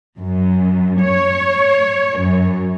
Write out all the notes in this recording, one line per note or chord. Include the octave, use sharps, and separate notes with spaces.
F#2
C#5
F#2